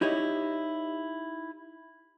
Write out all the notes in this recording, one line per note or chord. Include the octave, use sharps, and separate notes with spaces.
D#4 E4 G4 C#5 D#5